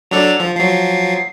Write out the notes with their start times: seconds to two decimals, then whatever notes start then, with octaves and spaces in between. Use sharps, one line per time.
0.11 F#3 D4 A4 F7
0.40 F3
0.57 F3 F#3 C7